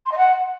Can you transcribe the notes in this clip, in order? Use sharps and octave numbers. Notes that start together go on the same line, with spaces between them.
C6
D#5
F#5